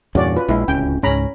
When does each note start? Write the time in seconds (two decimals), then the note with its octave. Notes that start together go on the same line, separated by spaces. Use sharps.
0.15 E2 G2 A#2 C#4 F#4 D5
0.36 F4 B4
0.49 A#1 G#3 E4
0.68 D1 C#2 C#4 G5
1.03 C#2 G#2 C#4 A#5 B5